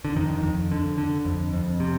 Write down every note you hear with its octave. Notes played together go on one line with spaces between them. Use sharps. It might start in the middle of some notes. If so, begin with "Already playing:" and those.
D3
F2 D#3
F2
D3
D3
F2
F2
C3